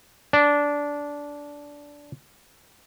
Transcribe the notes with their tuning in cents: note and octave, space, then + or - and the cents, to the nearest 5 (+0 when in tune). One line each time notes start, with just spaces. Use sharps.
D4 -15